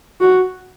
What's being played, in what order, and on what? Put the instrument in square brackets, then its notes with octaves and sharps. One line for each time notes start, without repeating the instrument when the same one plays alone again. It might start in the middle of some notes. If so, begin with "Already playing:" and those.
[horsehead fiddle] F#4